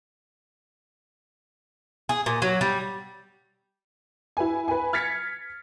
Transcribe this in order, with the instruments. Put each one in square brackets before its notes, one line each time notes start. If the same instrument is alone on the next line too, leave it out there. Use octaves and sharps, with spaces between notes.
[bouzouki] G#4
A#2
F#3
G3
[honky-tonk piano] E4 B4 G#5
B4 G#5
F6 G#6 A6 B6 C#7